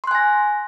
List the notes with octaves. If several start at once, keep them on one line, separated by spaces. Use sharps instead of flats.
G#5 C6 F#6 A#6